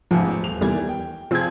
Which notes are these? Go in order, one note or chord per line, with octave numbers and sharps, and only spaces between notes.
A1 E2 G#2 F3
D#1 F7
E2 D#3 E3 G3 G#6
G5
F3 C4 F4 G#4 G#6